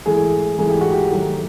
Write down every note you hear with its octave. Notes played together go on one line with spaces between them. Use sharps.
G#2 E3 A3 G#4
G#2 E3 A3 G#4
G4
F#4
G4
G#2 D#3 F#3 A3